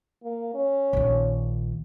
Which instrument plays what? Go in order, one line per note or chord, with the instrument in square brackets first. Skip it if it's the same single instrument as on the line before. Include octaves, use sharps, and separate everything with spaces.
[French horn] A#3
C#4
[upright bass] A#1 D#3